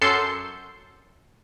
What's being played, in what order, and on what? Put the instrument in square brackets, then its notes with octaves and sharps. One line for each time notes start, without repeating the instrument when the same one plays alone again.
[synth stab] F#2 A4 C6 G6 C7 C#7